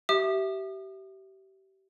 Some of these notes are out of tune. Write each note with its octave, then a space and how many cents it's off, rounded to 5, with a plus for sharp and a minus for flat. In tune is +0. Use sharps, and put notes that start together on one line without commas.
G4 -30 E5 +0 D#6 -45